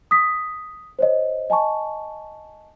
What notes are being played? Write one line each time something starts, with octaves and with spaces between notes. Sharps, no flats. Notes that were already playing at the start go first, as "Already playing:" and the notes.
D#6 B6
C5 C#5 D#5
D#5 G#5 A5 C#6